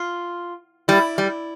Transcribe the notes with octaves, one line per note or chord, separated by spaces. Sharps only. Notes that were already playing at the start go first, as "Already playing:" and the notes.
Already playing: F4
G3 E4
G3